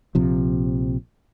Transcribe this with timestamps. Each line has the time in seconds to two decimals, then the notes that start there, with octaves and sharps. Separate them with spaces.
0.15 A#1 C3 F3